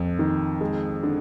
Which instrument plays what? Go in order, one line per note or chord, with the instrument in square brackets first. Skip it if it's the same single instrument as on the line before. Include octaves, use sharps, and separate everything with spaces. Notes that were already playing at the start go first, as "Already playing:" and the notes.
Already playing: [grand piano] F2
D#3
G#3
D3